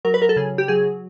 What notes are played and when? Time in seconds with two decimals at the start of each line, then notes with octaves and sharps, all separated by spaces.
0.05 F#3 A#4
0.14 B4
0.22 A#4
0.29 A4
0.36 C#3 G#4
0.58 G4
0.68 F#3 G#4